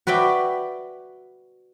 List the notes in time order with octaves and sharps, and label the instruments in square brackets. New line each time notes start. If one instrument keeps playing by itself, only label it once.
[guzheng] F#4 B4 D5 E5 G5